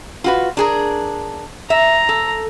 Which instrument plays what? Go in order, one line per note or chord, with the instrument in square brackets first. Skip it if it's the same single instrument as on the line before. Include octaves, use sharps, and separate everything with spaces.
[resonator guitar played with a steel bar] F4 F#4 B4
D4 G#4 A#4
[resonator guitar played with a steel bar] E5 [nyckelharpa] A#5
[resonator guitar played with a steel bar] A4